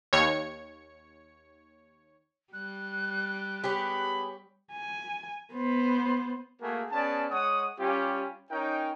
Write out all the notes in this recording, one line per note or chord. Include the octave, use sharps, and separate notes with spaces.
D#2 C#5 C#7
G3 F#6
B3 G4 G#4 C#5 B5
G#5
B3 C5
A3 A#3 F#4 G#4 A#4 G#5
B3 C#4 G#4 D5 A5
G#3 C#5 F#5 D#6
G3 C#4 F4 G4
C#4 D#4 A#4 C#5 G5